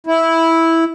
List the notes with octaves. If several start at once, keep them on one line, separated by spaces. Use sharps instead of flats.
E4